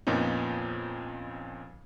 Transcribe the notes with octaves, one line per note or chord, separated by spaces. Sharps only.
F2 A#2 B3 C#4 D#4